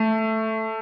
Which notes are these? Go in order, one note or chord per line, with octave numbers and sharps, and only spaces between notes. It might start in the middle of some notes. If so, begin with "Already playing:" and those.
Already playing: A3